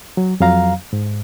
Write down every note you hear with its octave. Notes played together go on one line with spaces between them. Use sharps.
F#3
F2 F#3 F5 A#5
G#2